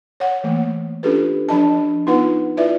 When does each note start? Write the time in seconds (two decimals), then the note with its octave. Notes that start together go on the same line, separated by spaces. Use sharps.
0.20 C#5 F#5
0.44 E3 A3 A#3
1.03 C#4 D4 F4 G4 A4 B4
1.49 F3 D4 D#5 A5
2.06 B3 D#4 F4 B4 F#5
2.57 E4 F4 B4 D5 E5